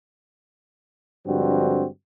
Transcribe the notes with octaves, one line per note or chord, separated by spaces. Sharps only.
G2 D3 F3 G#3 C4 F#4